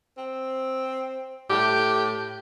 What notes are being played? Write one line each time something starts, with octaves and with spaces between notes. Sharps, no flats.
C4
A2 G4